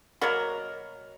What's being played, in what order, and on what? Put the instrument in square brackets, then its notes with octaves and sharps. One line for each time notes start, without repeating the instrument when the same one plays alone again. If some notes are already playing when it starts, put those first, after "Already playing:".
[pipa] B2 F#3 A#3 F#4 A#4